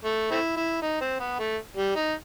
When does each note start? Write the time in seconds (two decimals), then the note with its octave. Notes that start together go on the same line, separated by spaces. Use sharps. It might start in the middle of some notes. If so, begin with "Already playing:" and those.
0.05 A3
0.31 A3 C4 E4
0.56 E4
0.82 D#4
1.01 C4
1.19 B3
1.39 A3
1.77 G3
1.96 D#4